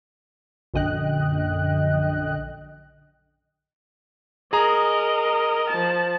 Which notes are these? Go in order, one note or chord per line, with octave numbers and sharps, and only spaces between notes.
A#1 F#2 D3 D#5 G5 F#6
G#4 A#4 D#5 A#5
F3 A5